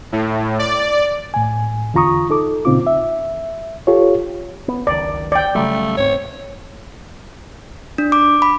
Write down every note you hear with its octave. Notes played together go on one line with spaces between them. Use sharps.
A2
D5
A2 G#5
E2 D3 F4 A#5 C#6 D#6
D#4 A4 D6
A#2 C#3 C4 D#4 F4 D6
E5
F4 G4 A4 C#5
B3
F#1 C#2 D#3 D5
D5 G5
C#3 F#3 G3 A3
D1 G#2 C4 C#5
D4
D6
B5